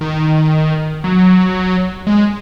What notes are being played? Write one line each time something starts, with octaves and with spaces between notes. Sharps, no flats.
D#3
F#3
G#3